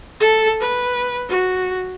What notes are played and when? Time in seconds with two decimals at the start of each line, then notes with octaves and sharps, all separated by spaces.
0.20 A4
0.60 B4
1.29 F#4